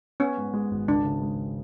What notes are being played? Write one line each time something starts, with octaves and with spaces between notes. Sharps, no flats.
B3 C#4
G#2
G#3
G#1
C#2 D4
C#3
G#3